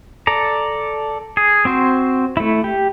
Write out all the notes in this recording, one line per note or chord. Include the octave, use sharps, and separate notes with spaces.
A4 D5 A#5
G#4
C4 F#4 C5
A3 E4
G4